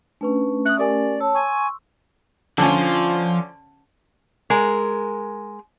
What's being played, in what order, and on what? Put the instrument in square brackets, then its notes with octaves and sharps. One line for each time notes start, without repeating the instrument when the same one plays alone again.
[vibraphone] A3 C#4 [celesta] D4 B4
[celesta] E5 D#6 [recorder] F#6
[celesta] G4 A#4 G#5 [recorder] D5
[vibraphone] C#5 A5 [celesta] E6
[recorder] G#5 [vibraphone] C6 C#6
[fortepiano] D3 C#4 [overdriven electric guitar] F3 F4
[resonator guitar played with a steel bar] G#3 A#4